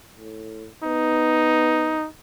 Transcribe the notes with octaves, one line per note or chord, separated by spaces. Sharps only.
A2
B3 D#4